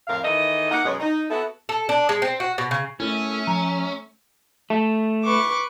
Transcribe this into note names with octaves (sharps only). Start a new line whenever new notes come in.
F2 A2 A#4 F5
D#3 E3 A4 D#5
A#3 D#4 A#4 F#5
F#2 B2 G#3 B4 C#5
D#4
B3 E4 F#4 A4
A4
D4
G#3
C4
F#4
B2
C#3
A3 C#4 E4 A4 A#4 E5
F3 A#5
A3
B4 C#6 D6